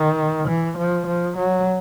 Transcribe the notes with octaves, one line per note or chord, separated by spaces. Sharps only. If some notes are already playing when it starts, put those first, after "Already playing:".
Already playing: D#3
E3
F3
F3
F#3